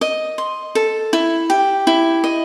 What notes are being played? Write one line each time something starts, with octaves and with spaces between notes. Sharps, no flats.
D#5
C6
A4
E4
G4
E4
D#5